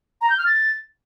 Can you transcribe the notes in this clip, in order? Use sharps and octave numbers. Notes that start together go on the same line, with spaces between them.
A#5
G6
F6
A6